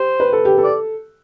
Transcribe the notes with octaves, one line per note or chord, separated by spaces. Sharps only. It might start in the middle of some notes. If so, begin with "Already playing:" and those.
Already playing: G4 C5
B4
A4
G4
A4
D5